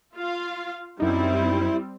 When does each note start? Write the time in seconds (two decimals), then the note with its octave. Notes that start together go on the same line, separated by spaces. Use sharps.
0.15 F4 F5
1.00 F#2 G3 C4 D#4 E4